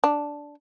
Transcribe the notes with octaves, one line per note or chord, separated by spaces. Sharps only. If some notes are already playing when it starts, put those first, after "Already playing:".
D4